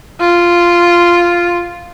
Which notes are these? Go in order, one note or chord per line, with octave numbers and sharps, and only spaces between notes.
F4